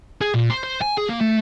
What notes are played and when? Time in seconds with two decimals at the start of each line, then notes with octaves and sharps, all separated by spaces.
0.21 G#4
0.34 A#2
0.50 C5
0.64 C5
0.82 G#5
0.98 G#4
1.09 A#3
1.21 A3